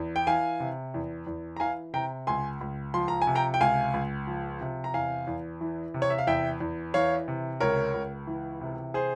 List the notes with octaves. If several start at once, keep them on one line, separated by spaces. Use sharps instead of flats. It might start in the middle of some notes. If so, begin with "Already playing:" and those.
Already playing: E2
G5
E3 F5 G#5
C3
E2
E2
A#5
E3 F5 G#5
C3 G5 A#5
C#2 G#5 C6
C#2
F3 C6
A#5
G#5
C3
G5 A#5
G5
C#2 F5 G#5
C#2
F3
C3
A#5
E2 F5 G#5
E2
E3
C3
C#5
E5
F5
E2 E5 G5
E2
E3 C#5 F5
C3
C#2 A#4 C#5
C#2
E3
C3
G#4 C5